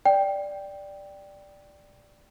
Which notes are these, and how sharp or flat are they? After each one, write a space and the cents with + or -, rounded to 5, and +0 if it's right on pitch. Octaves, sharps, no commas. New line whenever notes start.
D5 +0 G5 +0